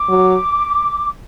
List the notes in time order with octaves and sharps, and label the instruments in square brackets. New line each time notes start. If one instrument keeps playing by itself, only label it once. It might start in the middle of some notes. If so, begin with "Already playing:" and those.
Already playing: [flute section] D6
[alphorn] F#3